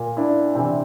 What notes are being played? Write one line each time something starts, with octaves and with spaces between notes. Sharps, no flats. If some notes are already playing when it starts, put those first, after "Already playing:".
Already playing: A#2
D4 E4
C3 E3 C4 D4